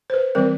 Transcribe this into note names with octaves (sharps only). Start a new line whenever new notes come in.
C5
B4
E3 G3 C4 A#4